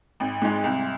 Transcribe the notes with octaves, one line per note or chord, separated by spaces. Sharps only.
G#1
G#2 G#3
C2